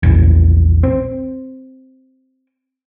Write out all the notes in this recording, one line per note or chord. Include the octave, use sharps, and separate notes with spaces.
A#1 E2
C4